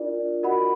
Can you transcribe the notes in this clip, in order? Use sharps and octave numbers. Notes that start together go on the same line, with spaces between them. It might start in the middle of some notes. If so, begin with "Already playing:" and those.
Already playing: D4 F4 A#4 D5
F#4 A#4 D#5 F#5 B5